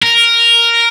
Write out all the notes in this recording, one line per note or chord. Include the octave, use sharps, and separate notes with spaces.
A#4